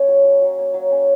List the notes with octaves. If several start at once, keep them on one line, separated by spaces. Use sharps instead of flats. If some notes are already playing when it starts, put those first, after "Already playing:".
Already playing: A#3 C#4 C#5 D#5
F#3
F#3
F#3
A#3
F#3
C#4